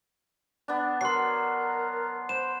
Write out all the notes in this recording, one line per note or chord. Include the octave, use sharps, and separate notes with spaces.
B3 D4
F#3 A#4 C6 C7
C5 B5 E7